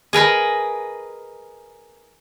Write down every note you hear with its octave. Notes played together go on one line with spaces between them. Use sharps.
G#4 A#4 B4 D#5